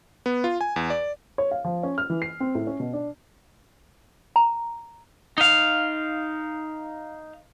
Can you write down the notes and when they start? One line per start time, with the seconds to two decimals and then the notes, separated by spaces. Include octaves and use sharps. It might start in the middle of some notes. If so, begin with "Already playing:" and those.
0.26 B3
0.44 F4
0.61 G#5
0.76 E2
0.90 D5
1.38 C#5
1.51 F5
1.64 F3
1.83 C#4
1.98 F6
2.10 E3
2.22 C7
2.40 C4
2.55 A2
2.67 C#4
2.80 B2
2.93 D4
4.36 A#5
5.38 D#4 F5